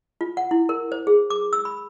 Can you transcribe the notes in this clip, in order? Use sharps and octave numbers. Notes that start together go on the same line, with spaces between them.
F4
F#5
E4
A#4
C5
G#4
D6
E6
B5